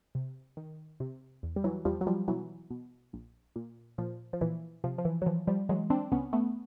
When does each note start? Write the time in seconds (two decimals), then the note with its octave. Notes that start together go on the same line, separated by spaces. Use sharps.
0.15 C3
0.57 D#3
1.00 C3
1.43 E2
1.56 G3
1.64 E3 F#3
1.85 E2 F3 G3
2.01 F#3
2.07 F3 G3
2.28 B2 E3 F#3
2.71 B2
3.13 A#1
3.56 A#2
3.98 A#2 F3
4.33 F3
4.41 A#2 E3
4.84 C3 F3
4.98 F3
5.05 E3
5.22 F#3
5.26 E3 F3
5.47 F3 G3
5.69 E3 F#3 G#3
5.90 C4 D4
6.12 C#2 B3 C#4
6.33 A3 B3